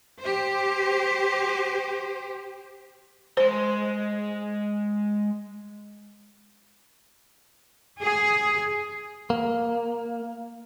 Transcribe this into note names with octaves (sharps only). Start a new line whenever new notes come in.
G4 C5
G#3 C5 C6
G#4
A#3